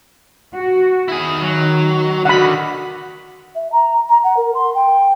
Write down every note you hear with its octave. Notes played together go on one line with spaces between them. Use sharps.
F#4
D#3 E4 G#4
F#3
D3 D#3 F#4 F#5 B5
E5
A#5
A#5
F#5
A#4
C6
G5